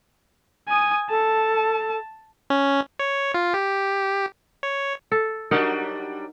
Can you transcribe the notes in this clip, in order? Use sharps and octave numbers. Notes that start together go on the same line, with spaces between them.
G#5 D#6
A4 A5
C#4
C#5
F4
G4
C#5
A4
F#3 G3 D4 D#4 A#4 F#5